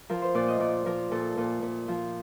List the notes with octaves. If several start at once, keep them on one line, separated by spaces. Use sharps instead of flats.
F3 A#4
C5
A#2 D5
D#5
A#2 D5
F3 A#4
A#2 A4
A#2
A#2
F3